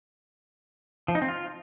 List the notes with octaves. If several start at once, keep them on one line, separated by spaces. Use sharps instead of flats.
F3
D#4
C4
F4